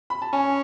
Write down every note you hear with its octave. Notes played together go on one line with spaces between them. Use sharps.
B5
A5
C#4 G#5